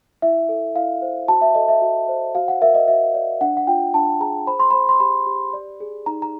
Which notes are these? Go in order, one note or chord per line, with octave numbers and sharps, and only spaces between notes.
E4 E5
A4
E4 F5
C5
F#4 A5
E5
A4 D#5
E5
F#4
C5
F#4 F5
F#5
A#4 E5
D#5
F#4 E5
D5
D4 F#5
F#5
F4 G5
D4 A5
G#4 A#5
C5 B5
C6
C5 B5
C6
G4 B5
G4
D5
G#4
D#4 A#5
A#5